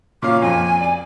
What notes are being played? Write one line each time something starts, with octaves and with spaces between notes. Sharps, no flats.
A#2 C#4 F5 D6
F2 G#5
D5